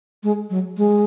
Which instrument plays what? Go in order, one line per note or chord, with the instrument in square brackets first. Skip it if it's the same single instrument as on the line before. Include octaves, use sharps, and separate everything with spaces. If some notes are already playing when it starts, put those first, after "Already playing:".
[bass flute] G#3
F#3
G#3